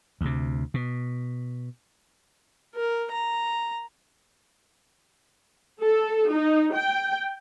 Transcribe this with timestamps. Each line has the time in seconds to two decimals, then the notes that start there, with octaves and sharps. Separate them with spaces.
0.21 D2 C3
0.74 B2
2.76 A#4
3.12 A#5
5.80 A4
6.30 D#4
6.74 G5